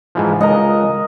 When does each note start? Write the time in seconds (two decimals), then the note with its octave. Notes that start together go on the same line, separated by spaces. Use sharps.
0.15 G#2 E3 F3
0.41 C#2 A#4 D#5 F#5